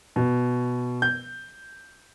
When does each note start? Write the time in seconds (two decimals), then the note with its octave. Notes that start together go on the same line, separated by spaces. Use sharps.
0.16 B2
1.02 G6